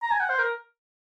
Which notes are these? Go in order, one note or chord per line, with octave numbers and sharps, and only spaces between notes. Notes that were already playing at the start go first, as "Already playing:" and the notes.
A#5
G#5
F#5
C5
A#4